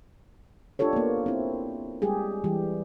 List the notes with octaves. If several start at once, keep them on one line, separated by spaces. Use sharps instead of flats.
D4 F4 G4 A4 C#5
A#3 B3
C4 E4
G3 G#3 G4 G#4
E3 G3 G4